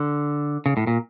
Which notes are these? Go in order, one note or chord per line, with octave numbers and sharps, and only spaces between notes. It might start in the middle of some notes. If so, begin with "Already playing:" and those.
Already playing: D3
C#3
A2
A#2